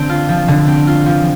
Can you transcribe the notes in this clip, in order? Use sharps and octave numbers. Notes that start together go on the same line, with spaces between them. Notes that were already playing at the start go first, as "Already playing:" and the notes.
Already playing: D3 C4
F4
F3
D3
C4
F4
F3